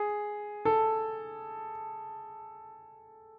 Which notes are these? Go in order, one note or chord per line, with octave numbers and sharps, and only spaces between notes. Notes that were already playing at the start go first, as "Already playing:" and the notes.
Already playing: G#4
A4